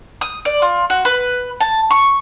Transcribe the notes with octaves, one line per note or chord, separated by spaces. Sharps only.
D#6
D5
F4
F#4
B4
A5
C#6